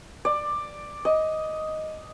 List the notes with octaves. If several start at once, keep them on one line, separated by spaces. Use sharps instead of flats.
D5
D#5